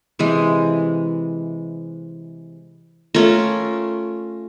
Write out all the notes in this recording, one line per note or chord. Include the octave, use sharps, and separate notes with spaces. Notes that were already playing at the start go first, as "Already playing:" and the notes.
C3 E3 G#3
A3 C#4 F4 A#4